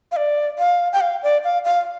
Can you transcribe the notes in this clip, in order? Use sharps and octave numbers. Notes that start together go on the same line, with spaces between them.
F5
D5
F5
G5
F5
D5
F5
F5